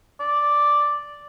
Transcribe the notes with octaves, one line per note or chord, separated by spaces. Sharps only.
D5